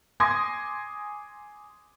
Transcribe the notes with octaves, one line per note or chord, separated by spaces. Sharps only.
G#5 C6 D6 D#6 G#6 A#6